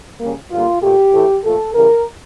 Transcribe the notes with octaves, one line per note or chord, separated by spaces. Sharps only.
C#3 G3 A#3
G2 D3 G3 A#3 F4
A#2 A3 G4
A2 E3 A3
A#2 F3 A3 A4
C#3 E3 G3 A#4